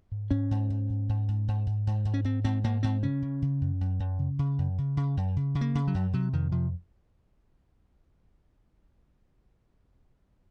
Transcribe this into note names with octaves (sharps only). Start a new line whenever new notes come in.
G#2
G#2 C#4
G#2
G#2
G#2
G#2
G#2
G#2
G#2
G#2
G#2
C#4
G#2 C4
G#2 C4
G#2 A#3
G#2 C4
C#3 C#4
C#3
C#3
F#2
F#2
F#2
C#3
C#3
F#2
C#3
C#3
F#2
C#3
C#3
A#3
C#3
F#3
F#2
C3 F#3
F2 D#3
C3 F3